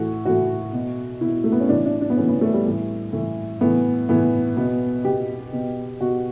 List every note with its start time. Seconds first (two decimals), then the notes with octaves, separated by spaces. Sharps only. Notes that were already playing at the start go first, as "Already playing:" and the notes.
Already playing: A2 E3 F#4
0.25 A2 E3 F#4
0.73 B2
1.21 B2 E4
1.44 A3
1.52 B3
1.60 C#4
1.69 A2 E3 D4
1.85 D4
2.01 D4
2.10 B3
2.17 A2 E3 C#4
2.29 B3
2.41 A3
2.53 G3
2.65 A2 E3
3.13 A2 E3
3.61 A2 E3 B3
4.09 A2 E3 B3
4.57 B2 B3
5.05 B2 G4
5.53 B2
6.00 B2 F#4